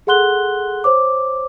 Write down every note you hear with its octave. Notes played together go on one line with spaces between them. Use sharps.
G#4 A4 F#5 C6 F#6 G7
C5 C#5 D6